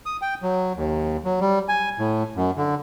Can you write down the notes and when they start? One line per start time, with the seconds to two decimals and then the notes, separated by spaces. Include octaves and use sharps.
0.06 D#6
0.22 G5
0.42 F#3
0.77 D#2
1.25 F#3
1.40 G3
1.68 G#5
1.99 A2
2.36 F#2
2.57 D3